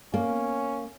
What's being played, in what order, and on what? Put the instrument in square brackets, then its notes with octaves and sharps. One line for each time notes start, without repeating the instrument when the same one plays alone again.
[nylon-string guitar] A#3 [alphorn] C#4